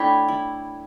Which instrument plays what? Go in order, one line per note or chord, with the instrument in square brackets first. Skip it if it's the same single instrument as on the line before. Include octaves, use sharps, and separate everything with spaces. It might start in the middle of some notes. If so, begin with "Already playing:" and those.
Already playing: [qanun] A3 D4 E4 [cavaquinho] C#5 G5 B5
[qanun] E4